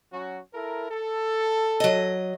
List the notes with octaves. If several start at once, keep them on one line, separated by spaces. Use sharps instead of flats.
F#3 C#4 F#4
E4 A4 A#4
A4
F#3 D#5